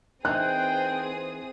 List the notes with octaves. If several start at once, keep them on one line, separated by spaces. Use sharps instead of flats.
E3 A#3 C4 D#4 G#4 G5 D#6 F#6